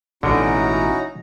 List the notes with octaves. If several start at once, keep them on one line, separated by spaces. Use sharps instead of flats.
A1 B2 D3 C#4 D#4 E4 F#4 A#5